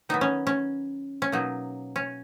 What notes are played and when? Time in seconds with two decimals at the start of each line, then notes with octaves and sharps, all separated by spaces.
0.09 D#3 F#3 B3 D#4
0.21 C#4
0.47 C#4
1.22 C#4
1.32 B2 F#3 A#3 D#4
1.96 C#4